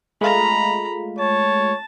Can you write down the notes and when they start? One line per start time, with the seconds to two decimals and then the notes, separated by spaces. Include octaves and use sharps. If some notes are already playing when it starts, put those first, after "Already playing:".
0.21 G#3 A3 F4 A#5 B5
1.19 C#5 A5